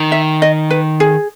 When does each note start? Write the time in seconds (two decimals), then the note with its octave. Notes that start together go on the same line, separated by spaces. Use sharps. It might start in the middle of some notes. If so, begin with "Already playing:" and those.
Already playing: D#3
0.12 E5
0.42 D#5
0.70 B4
1.00 G#4